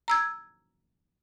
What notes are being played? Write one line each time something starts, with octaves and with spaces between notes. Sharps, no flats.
A#5 E6 G#6